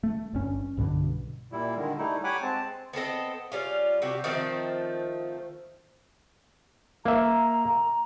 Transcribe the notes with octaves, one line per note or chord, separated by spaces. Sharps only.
A3
G1 G2 C#4
B1 G2 B2 D3
A#2 G3 E4
D3 D#3 G#3
G3 A3 D#4 E4
G4 C#5 F#5 G#5 B5 D6
G#3 C4 A5
B3 C4 A4 D#5
G3 C#4 F4
C3 F#4 G4
D#3 F3 A3 C4
A#3 E5 A#5